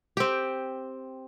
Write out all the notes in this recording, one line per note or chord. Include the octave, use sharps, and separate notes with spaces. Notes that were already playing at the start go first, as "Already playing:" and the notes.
C4 G4